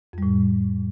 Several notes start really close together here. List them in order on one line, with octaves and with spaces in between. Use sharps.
F2 G3 A2